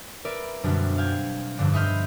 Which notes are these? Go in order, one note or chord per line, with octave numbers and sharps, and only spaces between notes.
A#4 B4 D5 E5
F#2 B2 D3 G3 C4 D4
F5 G5 G#6
F1 G2 D3 D4 E7
D#5 E5 B5 C6 F6 G6